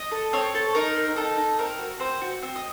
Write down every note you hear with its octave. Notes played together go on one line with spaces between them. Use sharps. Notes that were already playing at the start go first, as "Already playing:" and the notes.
Already playing: D#5
A4
C4 C#5
A4
D#4 A#4
C4
D#4 A4
D#4
C4 A#4
F#4
C4 C5
F#4
C4
D#5